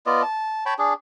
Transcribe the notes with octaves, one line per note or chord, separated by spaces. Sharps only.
B3 F4 D5 D#5
A5
C#5 G5 A5 B5
D4 G#4